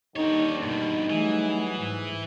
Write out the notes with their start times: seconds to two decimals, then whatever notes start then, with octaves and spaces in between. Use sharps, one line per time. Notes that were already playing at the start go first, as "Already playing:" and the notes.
0.16 D#2 D3 G3 C4 D#4 C#5
0.63 G2 B2 D#4
1.10 E3 F#3 G3 A3 G#4
1.76 G#2